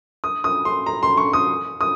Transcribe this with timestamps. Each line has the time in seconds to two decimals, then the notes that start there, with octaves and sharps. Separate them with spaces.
0.24 D#6
0.44 D#6
0.65 C6
0.86 A#5
1.03 C6
1.17 C#6
1.33 D#6
1.81 D#6